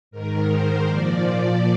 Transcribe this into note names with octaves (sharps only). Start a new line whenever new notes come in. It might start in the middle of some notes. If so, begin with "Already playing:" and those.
G#2 D#3 A#4
C5
A#2 F3 D5
D5